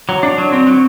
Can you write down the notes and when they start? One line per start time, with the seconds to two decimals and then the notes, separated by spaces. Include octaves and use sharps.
0.09 F#3
0.23 D4
0.38 F#3
0.52 C4
0.67 F#3